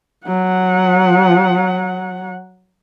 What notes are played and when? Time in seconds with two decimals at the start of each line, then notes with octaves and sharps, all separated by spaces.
0.27 F#3 F#5